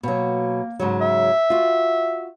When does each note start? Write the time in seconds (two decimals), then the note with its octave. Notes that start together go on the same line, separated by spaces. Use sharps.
0.03 B2 F#3 A#3
0.79 G#2 C#3 F#3
1.01 E5
1.50 F4 F#4